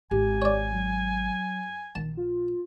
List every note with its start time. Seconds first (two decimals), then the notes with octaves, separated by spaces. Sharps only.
0.11 G#1 G4 G#5
0.42 C#5 D5
0.72 F#3
1.95 A#1 D#3 A5
2.17 F4